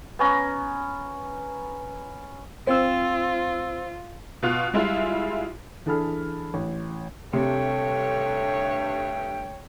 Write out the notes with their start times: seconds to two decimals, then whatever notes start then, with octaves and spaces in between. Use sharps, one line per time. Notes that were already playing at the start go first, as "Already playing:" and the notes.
0.19 B3 C#4 A#5
2.67 C4 F4 C5 E6
4.43 B2 F4 F#6
4.73 G3 G#3 E4 F4
5.86 E3 D4 G#4 A4 B5 F6
6.54 A1
7.33 G2 C3 A3 C#5 G5